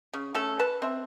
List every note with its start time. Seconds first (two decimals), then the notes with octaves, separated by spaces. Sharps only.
0.13 C#3
0.34 A3 C#4 A4
0.59 B4 A5
0.82 C4 E5